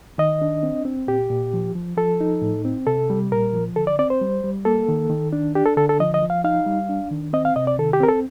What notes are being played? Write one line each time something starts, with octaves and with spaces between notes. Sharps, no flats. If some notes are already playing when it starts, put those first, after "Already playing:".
D#3 D#5
D4
C4
C4
A#2 G4
A#2
F3
F3
F3 A4
D#4
A2
C4
C3 A4
G3
A#2 A#4
F3
D3 A4
D5
C4 D5
C5
G3
G3
A#3 A4
D#3
D#3
D4
D4 G4
A4
D3 A4
A4
F3 D#5
D#5
F3
F5
D#4 F5
G3
D4
D#3
C4 D#5
F5
C3 D#5
D5
D#3 A4
G4
C4 A#4
A4